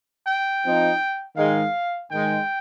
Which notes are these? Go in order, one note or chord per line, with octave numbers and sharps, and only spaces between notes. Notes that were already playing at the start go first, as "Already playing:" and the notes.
G5
F3 C4 D#4
G#2 D#3 G#3 F5
G#2 D#3 G#3 G5